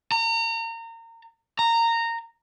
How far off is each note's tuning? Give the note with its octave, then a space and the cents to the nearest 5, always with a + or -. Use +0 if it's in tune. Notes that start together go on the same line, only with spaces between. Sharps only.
A#5 -30
A#5 -15